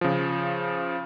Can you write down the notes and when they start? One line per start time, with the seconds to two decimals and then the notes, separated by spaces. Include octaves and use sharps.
0.01 C#3 F3